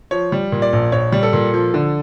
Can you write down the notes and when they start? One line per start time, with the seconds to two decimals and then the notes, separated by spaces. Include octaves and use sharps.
0.11 F3 C#5
0.32 G3
0.52 A#2
0.62 D5
0.73 A#1
0.92 A#1 C#5
1.12 G3
1.23 A4
1.33 A#2
1.54 F3
1.74 D3